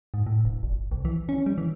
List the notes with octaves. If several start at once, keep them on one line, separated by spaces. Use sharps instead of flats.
G#2
A2
E1
G1
C2
E3
C#4
G3
E3